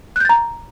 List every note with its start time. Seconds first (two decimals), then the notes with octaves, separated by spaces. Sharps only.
0.16 F#6
0.20 G6
0.25 A6
0.29 A#5